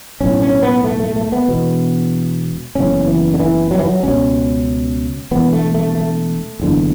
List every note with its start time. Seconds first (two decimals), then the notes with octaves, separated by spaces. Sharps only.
0.21 B1 A2 C#4
0.42 C#4
0.62 B3
0.84 A3
1.00 A3
1.16 A3
1.32 B3
1.48 E1 E2 B2
2.75 F#1 E2 C#3 C#4
3.07 E3
3.34 D3
3.40 E3
3.71 F#3
3.79 E3
3.86 F#3
4.03 C#2 B2 C#4
5.31 E1 E2 D3 B3
5.53 A3
5.75 A3
5.95 A3
6.60 F#1 E2 D3